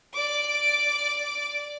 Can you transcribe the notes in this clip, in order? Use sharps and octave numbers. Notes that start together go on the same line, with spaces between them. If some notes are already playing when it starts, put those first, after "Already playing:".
D5 D6